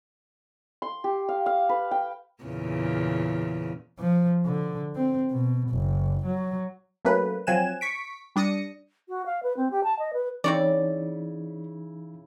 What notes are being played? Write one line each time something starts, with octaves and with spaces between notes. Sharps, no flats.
C6
G4
F5
F5
B4
G5
E2 A#2 C#3
F3
D3
C4
B2
F#1
F#3
F#3 A3 A#3 C#4 B4
F3 F#3 C4 G#5 F#6 E7
C#6 B6 D7
G3 D4 D#6 A#6 C#7
F#4
F5
B4
C4
G4
A5
D#5
B4
C#3 E3 C4 C#4 D#4 E4 C#5 D5